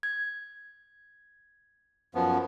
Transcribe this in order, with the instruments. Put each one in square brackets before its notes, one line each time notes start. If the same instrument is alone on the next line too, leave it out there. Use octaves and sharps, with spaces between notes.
[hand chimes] G#6
[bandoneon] F#2 F3 B3